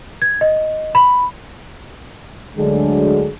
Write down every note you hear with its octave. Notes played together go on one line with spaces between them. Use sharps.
G#6
D#5
B5
D2 D3 F#3 G#3 D4 G#4